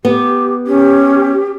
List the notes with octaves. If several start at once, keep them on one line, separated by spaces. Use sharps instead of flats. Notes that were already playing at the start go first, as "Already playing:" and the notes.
B3 G4
C#4 G4